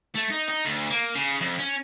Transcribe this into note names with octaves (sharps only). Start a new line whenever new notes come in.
A3
D#4
D#4
D2
A#3
C#3
F2
C#4